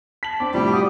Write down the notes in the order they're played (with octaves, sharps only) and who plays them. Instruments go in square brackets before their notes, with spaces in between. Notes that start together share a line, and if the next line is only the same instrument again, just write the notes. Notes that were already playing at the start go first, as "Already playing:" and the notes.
[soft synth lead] A5 [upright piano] B6 F#7
[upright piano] C4 D4 [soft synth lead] D6
[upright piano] A2 C3 F3 [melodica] G3
[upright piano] F#4 [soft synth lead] D#6